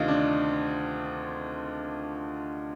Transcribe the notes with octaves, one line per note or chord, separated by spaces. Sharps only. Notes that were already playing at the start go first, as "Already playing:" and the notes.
Already playing: D2 C3 D#3 D#4 F4
D4